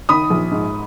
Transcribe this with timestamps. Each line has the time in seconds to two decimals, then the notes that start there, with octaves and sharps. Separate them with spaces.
0.09 D#3 B5 D#6
0.30 A#1
0.52 G#2